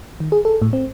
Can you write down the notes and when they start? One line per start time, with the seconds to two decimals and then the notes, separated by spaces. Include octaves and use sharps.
0.20 D#3
0.32 G#4
0.45 A4
0.62 A2
0.73 C4